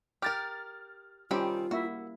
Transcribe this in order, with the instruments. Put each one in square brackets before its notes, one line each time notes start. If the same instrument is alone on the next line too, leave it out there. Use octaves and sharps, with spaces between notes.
[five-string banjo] G4 A#4 [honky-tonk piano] F6 A6
[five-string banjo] D#3 C4 B5 [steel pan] G3 C#4 G4 [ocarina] F4
[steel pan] A#3 E4 E5 [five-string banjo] F#4